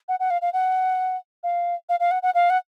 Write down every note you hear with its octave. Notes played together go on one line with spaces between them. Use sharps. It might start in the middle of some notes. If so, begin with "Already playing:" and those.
F#5
F#5
F5
F5
F#5
F5
F5
F5
F#5
F#5
F5
F#5